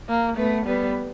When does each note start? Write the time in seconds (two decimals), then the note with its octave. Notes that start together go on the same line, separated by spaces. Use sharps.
0.09 A#3
0.38 A3 B3 B4
0.66 G3 B3 B4